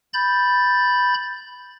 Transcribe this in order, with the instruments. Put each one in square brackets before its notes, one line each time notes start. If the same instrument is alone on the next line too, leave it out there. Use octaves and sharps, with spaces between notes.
[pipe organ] B5 G6 A6